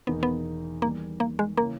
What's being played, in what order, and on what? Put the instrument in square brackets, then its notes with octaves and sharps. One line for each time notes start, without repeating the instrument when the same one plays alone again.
[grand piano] E1 E2 D#3 A#3 D#4 [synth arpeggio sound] B3
[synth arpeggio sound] B3
[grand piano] E2 D#3 G3 [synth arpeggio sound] A#3
[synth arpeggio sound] A#3
G#3
[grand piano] C#3 E3 [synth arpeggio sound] A#3